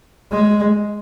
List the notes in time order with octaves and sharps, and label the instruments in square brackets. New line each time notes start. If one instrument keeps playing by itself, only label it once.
[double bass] G#3